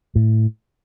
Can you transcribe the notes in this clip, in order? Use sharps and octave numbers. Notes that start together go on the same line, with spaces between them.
A2